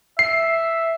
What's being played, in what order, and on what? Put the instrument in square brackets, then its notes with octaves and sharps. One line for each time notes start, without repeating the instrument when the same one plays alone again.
[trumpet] E5 [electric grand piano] C7